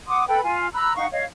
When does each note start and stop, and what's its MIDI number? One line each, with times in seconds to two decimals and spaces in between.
0.07 0.24 78
0.07 0.24 84
0.07 0.24 86
0.07 0.24 87
0.28 0.41 69
0.28 0.41 71
0.28 0.41 79
0.28 0.41 83
0.44 0.68 65
0.44 0.68 80
0.74 0.96 82
0.74 0.96 83
0.74 0.96 88
0.74 0.96 90
0.97 1.07 63
0.97 1.07 77
0.97 1.07 78
0.97 1.07 85
1.11 1.24 73
1.11 1.24 75
1.11 1.24 77